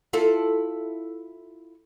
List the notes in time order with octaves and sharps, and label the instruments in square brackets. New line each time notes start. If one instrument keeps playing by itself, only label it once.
[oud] E4 F4 A4